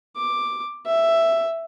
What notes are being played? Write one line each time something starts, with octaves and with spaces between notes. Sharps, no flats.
D6
E5